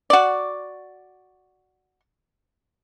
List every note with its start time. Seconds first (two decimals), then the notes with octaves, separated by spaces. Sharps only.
0.10 F#4 D5